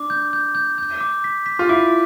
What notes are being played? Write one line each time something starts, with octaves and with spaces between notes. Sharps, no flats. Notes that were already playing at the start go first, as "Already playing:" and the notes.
Already playing: D4 D6
G6
G6
G6
G6
D6
B6
B6
F4
E4 D6